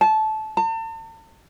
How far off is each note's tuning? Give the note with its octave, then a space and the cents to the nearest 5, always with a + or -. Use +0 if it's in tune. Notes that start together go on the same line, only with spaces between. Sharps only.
A5 -20
A5 +40